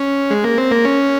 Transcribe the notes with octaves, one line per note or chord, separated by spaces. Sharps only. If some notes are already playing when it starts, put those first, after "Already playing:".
Already playing: C#4
G#3
A#3
C4
A#3
C#4